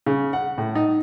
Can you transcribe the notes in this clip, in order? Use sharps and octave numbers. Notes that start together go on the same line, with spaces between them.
C#3
F#5
A2
D#4